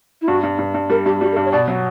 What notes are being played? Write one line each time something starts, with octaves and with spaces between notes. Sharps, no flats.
E4
G2 F#4
G2
G2
G2
G3 A#4
G2 G4
G3 F#4
A#4
G2 G4
C#5
B2 D5
F#3